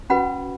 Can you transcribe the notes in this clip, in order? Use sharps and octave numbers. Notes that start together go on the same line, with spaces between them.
C#4 F#4 B4 F#5 B5